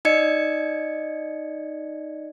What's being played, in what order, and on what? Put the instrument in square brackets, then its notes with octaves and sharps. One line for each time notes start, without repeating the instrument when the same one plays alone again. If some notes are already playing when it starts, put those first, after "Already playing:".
[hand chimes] D#4 D5 D#5 G#6 C#7